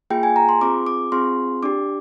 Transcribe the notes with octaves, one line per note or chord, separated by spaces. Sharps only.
A#3 F4 G#4 G5
G#5
A#5
C6
C4 F4 G#4 D6
D6
C4 F4 G#4 C6
D4 G4 D6